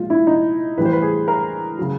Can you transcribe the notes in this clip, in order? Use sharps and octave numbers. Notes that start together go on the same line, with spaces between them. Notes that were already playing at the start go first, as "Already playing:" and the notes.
Already playing: A#2 F3 G#3 F4
E4
D#4
A2 E3 G3 B4
C5
B4
G#4
A#4
C#3 F#3